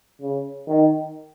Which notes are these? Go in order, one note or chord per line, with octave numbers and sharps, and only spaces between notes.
C#3
D#3